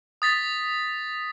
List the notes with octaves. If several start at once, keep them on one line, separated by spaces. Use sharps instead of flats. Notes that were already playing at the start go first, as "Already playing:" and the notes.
D#6 A6 B6